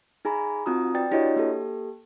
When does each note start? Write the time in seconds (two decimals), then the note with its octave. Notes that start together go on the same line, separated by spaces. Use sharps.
0.25 D#4 G#4 G#5 A#5 B5
0.66 C4 D#4 F4 F#4 A#5 D#6
0.94 B4 D5 G5 A6
1.11 D4 E4 F#4 G4 C#5 D#5
1.36 A#3 G4 A4